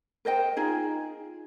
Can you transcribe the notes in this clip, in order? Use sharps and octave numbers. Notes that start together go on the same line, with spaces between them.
A#4 C5 D#5 G5
D#4 F4 G#4